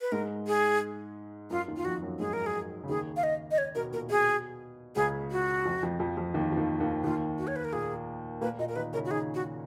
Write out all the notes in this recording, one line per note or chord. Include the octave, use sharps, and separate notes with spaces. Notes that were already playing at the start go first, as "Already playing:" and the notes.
B4
G#2 G#3 A#4
G#4
F#2 F#3 F4
D#2 D#3
F4
F2 F3 F#4
F#2 F#3
G#2 G#3 G#4
A#4
G#4
C#3
D#2 D#3 G#4
F5
D#5
D#5
C#5
B2 A#4
A#2 A#4
B2 G#4
C#2 C#3 G#4
F#4
F2 F3
F2 F3
F2 F3
F2 F3
D#2 D#3
F3
D#2 D#3
D#2 D#3
D#2 D#3 F4
F#4
C#5
B4
A#4
A#2 A#3 G#4
A#2 A#3 B4
A#2 A#3 D#5
A#4
D#3 D#4 B4
C#3 C#4 A#4
F#4
D#3 D#4 G#4
F#4